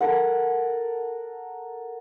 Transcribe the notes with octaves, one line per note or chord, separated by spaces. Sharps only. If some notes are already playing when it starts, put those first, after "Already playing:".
A4 A#4 F#5